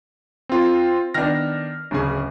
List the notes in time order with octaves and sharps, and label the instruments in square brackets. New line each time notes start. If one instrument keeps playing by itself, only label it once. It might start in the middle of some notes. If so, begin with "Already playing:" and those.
[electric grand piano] C4 F4
[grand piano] D#3 B3 D4 [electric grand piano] F6 A#6
[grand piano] D1 C#3 G#4